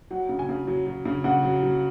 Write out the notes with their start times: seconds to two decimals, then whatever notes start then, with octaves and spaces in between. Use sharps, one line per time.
0.11 F#3 F#5
0.29 C#3
0.39 G#5
0.49 C#3
0.67 F#3
0.86 F#3
1.05 C#3
1.24 C#3 F#5
1.43 F#3
1.63 F#3